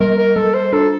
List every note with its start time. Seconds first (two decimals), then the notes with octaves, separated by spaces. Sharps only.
0.01 G3 A#4
0.18 A#4
0.36 G3 A4
0.54 C5
0.73 D4 A4